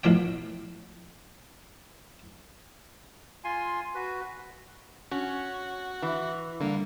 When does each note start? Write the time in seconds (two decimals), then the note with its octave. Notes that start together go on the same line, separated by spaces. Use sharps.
0.04 B1 A2 F3 B3 C#5 G5
3.44 F4 G#5 C6
3.94 F#4 B4
5.11 C#4 F#4
6.02 E3
6.60 D3 G3 A#3 D4